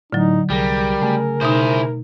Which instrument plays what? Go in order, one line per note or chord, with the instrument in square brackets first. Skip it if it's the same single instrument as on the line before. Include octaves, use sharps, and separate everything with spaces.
[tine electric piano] A2 [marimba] D3 F#3 [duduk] D#4
[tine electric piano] C2 G#4 A#6 [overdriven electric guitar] G3 [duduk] A#4
[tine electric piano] C#3 G#4 G#5 [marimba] A3
[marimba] B2 D#4 [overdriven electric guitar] E4 C5